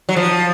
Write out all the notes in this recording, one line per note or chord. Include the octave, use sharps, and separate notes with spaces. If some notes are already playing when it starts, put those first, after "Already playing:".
F#3
F3